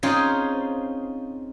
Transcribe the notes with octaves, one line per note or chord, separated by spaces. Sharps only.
C4 C#4 D#4 F4 G#4 C5